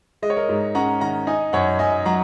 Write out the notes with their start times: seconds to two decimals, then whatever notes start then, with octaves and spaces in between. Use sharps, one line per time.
0.22 G#3 D#5
0.30 C#5
0.37 A#4 D#5
0.49 G#2
0.75 C#4 F#5 A#5
1.01 D#3 F#5 A#5
1.27 D#4 D#5 G#5
1.53 F#2 C#5 F#5
1.79 F#2 D#5 G#5
2.06 F#3 F#5 A#5